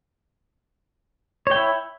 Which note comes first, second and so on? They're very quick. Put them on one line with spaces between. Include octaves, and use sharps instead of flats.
C#5 G5 E4